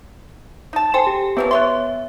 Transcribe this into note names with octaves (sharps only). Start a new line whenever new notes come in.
D#4 A5
A4 C5 G5 G#5
G4
D#3 F3 F#3 B3 B4
B4 C#5 E5 C6